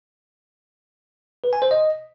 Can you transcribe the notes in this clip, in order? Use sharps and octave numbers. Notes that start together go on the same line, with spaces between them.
B4
G#5
C5
D#5